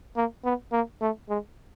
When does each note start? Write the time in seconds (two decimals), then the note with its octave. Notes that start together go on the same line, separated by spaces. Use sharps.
0.16 A#3
0.45 B3
0.72 A#3
1.01 A3
1.29 G#3